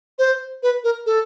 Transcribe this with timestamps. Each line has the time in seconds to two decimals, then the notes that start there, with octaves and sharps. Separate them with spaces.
0.19 C5
0.63 B4
0.84 A#4
1.06 A4